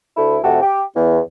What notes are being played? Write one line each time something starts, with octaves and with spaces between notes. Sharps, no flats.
D2 A3 E4
F2 C3 A3 F#4 G4 A4
G4
E2